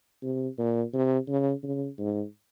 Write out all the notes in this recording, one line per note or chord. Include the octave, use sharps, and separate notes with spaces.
C3
A#2
C3
C#3
C#3
G#2